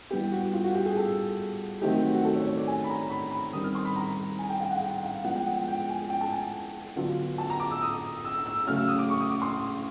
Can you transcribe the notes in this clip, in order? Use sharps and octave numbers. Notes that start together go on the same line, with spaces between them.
E3 G3 B3 G4
F#4
F4
F#4
G4
G#4
A4
D#3 F#3 A3 C4 D#4 G4
F#4
F#4
A4
C#5
C#5
D5
G#5
B5
A#5
B5
B5
D#3 G3 C4 D#6
F6
C6
B5
A#5
G#5
G5
F5
F#5
G5
F5
F3 G#3 B3 D4 F4 F#5
G5
F#5
G5
G5
G#5
G5
A5
G#5
D3 F#3 B3 D4 F4
A5
A#5
D6
E6
D#6
E6
E6
C#3 F#3 A3 C#4 F6
E6
D#6
D6
C#6
D#6
D6
C6